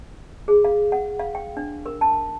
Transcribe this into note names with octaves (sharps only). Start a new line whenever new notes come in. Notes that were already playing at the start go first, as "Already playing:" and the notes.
G#4
F5
F#5
F5
G5
D4
A#4
A5